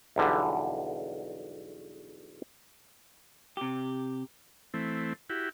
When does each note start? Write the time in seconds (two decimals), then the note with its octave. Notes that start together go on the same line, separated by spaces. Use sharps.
0.16 B1 E2 D3 G3
3.57 C3 G4
4.74 E3 A3 C4
5.30 E4 F#4 G4